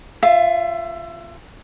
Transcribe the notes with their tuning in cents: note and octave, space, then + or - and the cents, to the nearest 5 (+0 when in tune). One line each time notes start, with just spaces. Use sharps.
F4 -5 E5 +25